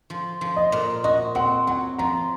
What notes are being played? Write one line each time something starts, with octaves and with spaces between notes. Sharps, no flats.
F3
F3
D#5
A#2
F#4 D#5
C4 F#5
F#3 F#5
F3 A#5